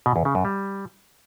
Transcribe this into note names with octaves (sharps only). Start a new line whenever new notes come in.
B2
E2
C#3
F#2
G3